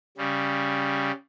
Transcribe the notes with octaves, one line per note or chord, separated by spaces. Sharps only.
C#3 G3